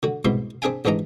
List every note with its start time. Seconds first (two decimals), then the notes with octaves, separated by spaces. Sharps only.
0.03 D3 F#4
0.25 C2 G#2 B2 E4 E5 C6
0.62 C4 D4 G#4 E5 G5 G#5
0.85 A1 G#2 E3 D4 D#4 A#5